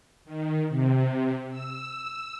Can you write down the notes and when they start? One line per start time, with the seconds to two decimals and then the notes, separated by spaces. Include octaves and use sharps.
0.25 D#3
0.69 C3
1.50 E6